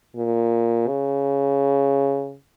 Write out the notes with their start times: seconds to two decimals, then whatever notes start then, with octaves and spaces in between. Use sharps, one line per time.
0.16 A#2
0.88 C#3